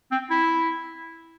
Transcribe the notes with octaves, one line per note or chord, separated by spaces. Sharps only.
C4
E4